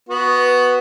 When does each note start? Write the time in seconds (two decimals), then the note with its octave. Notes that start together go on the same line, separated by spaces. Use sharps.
0.09 B3 F#4